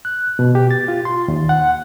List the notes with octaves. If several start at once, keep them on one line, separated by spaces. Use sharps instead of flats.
F#6
B2
G4
A6
F4
C6
D#2
F#5